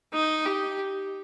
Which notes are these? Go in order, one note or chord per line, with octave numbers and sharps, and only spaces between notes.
D#4
G4